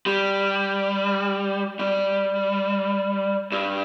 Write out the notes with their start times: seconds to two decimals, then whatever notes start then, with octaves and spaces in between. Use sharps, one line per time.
0.06 G3
1.79 G3
3.52 G2